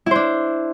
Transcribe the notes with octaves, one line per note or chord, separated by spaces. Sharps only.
D4 E4 C5